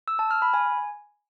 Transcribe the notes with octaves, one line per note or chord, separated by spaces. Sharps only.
E6
A5
F6
B5
G#5